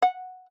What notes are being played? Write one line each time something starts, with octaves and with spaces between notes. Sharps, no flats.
F#5